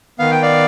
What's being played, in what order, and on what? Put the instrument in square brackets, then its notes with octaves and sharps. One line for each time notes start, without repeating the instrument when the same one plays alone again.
[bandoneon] D#3 B3 F5
G5
D5 F5